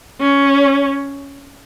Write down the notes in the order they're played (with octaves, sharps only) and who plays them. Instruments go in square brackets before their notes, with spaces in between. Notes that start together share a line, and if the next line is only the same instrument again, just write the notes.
[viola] C#4